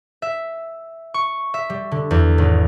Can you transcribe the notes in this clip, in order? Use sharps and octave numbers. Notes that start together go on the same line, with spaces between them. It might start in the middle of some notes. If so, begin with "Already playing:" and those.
E5
C#6
E5
G3
D3
E2
G#1